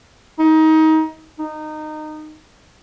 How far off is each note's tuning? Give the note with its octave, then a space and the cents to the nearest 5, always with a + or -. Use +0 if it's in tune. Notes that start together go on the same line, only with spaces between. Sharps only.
D#4 +25
D#4 -20